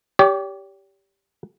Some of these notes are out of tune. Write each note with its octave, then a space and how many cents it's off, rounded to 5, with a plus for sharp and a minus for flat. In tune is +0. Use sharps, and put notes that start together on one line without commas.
G4 +0 C#5 +45